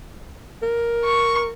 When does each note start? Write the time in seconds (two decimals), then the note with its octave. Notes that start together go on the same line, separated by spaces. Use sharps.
0.62 A#4
1.05 C#6